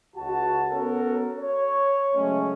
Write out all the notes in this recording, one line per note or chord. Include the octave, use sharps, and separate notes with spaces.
C#2 F#4 A5
B3 C#4 F#4 A4 A#4 C#5
C#5
C#3 F#3 G#3 A3 C#4